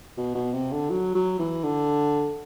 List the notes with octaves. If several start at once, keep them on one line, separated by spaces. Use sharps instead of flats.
B2
B2
C3
D3
F#3
F#3
E3
D3